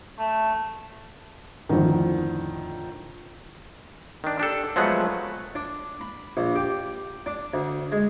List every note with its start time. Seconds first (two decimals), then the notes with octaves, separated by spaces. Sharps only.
0.19 A3
1.69 F2 A2 D3 D#3
4.24 D#3 D4
4.39 D4 G4 A4
4.76 F3 F#3 G#3 A3 B3 F#5
5.55 D4
6.01 B5
6.37 A#1
6.55 G4
7.26 D4
7.54 D2
7.92 G#3